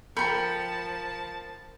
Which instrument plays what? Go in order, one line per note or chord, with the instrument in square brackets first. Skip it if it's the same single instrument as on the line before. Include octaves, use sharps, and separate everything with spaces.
[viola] F3 A5 [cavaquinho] A#4 G5 [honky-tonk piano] B5 G6 C#7